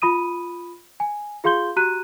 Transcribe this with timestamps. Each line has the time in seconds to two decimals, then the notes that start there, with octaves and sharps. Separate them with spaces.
0.02 F4 B5 D#6 D#7
1.00 G#5
1.44 F4 G#4 F5 C6 G6 G7
1.76 F#4 G4 A#5 F#6 D#7